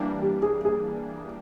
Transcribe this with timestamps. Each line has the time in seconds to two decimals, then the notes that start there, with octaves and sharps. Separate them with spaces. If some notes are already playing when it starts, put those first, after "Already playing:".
Already playing: E3 G3 A#3 D4
0.22 G4
0.42 G#4
0.65 G#4